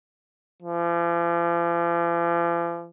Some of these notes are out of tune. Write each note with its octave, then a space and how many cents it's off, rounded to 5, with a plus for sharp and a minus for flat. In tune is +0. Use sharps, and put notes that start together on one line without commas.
F3 -45